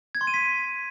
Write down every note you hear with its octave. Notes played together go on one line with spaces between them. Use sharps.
G#6
C6
D#7
B6